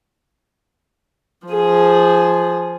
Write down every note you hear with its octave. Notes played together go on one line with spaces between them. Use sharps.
F3 G#4